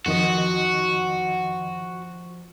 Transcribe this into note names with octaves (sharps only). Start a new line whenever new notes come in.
F2 D#3 F3 F#4 D#5